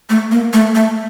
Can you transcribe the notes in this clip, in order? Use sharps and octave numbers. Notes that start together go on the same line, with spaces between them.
A3
A#3
A3
A3